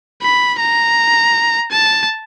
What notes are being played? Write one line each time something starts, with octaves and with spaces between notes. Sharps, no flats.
B5
A#5
A5